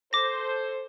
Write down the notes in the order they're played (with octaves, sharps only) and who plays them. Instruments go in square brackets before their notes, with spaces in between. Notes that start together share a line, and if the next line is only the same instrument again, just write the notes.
[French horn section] A4 C5 [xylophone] D6 A#6